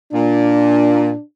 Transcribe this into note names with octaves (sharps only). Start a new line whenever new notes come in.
A#2 D4